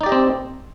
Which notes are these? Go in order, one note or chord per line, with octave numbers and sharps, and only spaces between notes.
C4 D#4 G4 D5 D#5